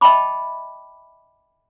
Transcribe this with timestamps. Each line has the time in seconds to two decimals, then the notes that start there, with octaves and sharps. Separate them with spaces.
0.01 D#5 E5 G5 A5 B5 D6